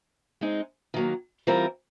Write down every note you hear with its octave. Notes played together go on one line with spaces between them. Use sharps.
G#3 C4 D#4 G#4
D#3 F#3 A#3
E3 G3 C4 F4 A#4